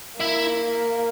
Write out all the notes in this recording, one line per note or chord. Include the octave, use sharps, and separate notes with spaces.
A#3 E4